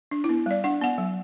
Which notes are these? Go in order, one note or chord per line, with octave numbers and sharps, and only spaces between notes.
D4
E4
B3
G3 D5
D4 F#5
B3 F#5
F#3